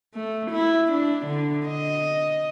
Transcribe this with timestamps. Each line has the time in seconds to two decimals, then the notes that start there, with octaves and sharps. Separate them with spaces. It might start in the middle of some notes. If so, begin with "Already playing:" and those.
0.15 A3
0.51 E4
0.92 D4
1.26 D3
1.67 D#5